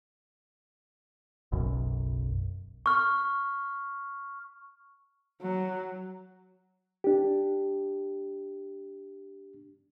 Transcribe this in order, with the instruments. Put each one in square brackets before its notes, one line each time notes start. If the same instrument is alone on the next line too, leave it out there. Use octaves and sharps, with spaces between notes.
[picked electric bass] F#1 B1 F#2
[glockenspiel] C#6 F6
[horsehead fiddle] F#3
[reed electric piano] D4 G4